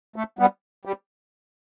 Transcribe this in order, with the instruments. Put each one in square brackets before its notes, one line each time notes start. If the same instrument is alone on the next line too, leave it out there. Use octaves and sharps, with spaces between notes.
[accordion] A3
G3 B3
G3